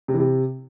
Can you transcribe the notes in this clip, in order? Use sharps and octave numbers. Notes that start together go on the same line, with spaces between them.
C3
E3
C3